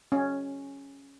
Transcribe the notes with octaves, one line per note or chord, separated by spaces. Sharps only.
C#4